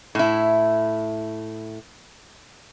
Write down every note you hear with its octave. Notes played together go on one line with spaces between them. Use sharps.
A2 E4